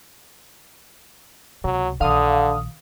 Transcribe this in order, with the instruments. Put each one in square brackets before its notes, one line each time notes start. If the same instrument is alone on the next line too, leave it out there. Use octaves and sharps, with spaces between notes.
[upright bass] C#2 C3 [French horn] F#3
[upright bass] A#1 D#3 [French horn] D3 [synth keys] F5 D#6